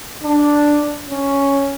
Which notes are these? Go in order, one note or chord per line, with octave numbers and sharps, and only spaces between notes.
D4
C#4